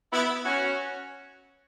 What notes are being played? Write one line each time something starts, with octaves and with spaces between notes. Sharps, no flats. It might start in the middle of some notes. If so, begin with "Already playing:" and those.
B3 E4
C#4 F#4